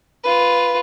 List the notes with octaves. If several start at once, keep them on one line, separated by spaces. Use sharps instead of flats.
F4 B4